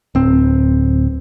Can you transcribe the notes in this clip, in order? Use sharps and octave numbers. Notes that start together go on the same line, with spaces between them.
D1 C4